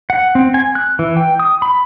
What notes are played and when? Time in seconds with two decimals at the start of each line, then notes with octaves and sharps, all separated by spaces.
0.10 F#5
0.35 C4
0.54 G#5
0.75 F#6
0.99 E3
1.17 G5
1.40 D#6
1.62 B5